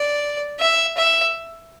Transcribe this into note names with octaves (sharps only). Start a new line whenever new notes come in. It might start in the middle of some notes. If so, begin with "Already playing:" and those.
Already playing: D5
E5
E5